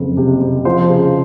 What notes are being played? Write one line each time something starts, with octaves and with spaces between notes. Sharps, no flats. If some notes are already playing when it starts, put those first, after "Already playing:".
Already playing: F#1 F2
C3
C3
F3 C5
C#3